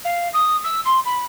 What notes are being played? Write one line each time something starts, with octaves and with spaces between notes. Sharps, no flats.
F5
D#6
E6
C6
B5